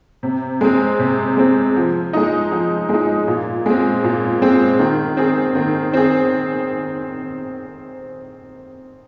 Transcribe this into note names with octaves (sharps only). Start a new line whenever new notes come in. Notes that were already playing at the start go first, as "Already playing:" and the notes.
C3
G#3 C4
C3
G#3 C4
F3
G#3 D#4
F3
G#3 D#4
A#2
G#3 C4
A#2
G#3 C4
D#3
C4 G#4
D#3
C4 G#4